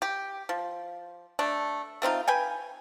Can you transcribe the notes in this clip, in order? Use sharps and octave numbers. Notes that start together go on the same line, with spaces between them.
G4
F3
A3 D4
A3 C4 D#4 F4
B4 G5 G#5